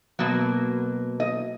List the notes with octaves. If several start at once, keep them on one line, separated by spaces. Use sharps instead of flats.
B2 F#3 A#3
D#5